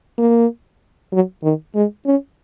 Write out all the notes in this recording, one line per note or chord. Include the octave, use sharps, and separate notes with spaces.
A#3
F#3
D#3
G#3
C#4